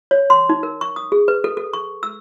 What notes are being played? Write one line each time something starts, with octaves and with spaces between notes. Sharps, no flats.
C#5
C6
D#4
A#4
C#6
D#6
G#4
B4
A4
A4
C#6
E6